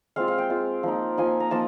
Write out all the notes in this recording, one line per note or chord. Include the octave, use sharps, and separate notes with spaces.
G#3 C4 F4 F5
F5
G5
G#3 C4 F4
F3 A#3 D#4
F3 A#3 D#4 G#5
A#5
F3 A#3 D#4 A5